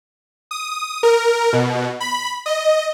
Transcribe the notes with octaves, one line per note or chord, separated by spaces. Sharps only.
D#6
A#4
B2
B5
D#5